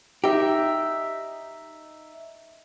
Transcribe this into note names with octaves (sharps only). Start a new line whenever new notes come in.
D#4 G4 E5